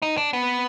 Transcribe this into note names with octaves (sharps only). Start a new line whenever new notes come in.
D#4
D4
B3